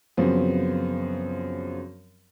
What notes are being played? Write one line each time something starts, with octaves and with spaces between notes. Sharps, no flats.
F#2 C#3 F3 B3 C4